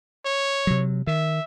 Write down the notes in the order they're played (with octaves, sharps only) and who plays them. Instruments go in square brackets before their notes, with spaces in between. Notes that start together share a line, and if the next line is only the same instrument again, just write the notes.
[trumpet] C#5
[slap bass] C3 F#3
[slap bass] D#3 [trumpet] E5